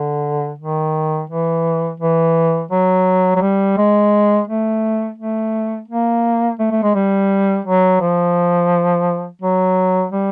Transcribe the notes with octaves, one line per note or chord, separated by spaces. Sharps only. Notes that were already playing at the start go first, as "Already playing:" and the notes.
Already playing: D3
D#3
E3
E3
F#3
F#3
G3
G#3
A3
A3
A#3
A3
A3
G#3
G3
F#3
F3
F#3
G3